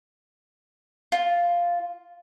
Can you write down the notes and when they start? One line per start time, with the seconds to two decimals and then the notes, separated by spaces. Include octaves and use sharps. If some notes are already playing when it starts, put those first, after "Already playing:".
1.12 F4